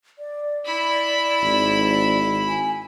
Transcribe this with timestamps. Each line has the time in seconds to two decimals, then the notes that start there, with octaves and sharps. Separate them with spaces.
0.19 D5
0.65 E4 B5
1.42 G#1
2.48 G#5